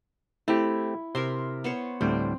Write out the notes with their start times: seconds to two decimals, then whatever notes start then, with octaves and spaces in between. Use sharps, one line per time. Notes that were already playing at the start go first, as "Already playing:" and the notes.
0.48 A3 C4 E4 G4
1.15 C3 A#4 E5 C6
1.64 B3 C5 C#5
2.01 D2 A2 G3 C4